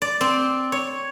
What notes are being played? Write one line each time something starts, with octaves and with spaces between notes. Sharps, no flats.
D5
C4
C#5